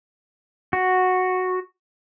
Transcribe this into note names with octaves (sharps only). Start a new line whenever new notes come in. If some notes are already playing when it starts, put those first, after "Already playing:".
F#4